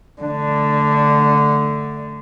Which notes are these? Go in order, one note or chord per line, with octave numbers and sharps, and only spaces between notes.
D3 A3 D4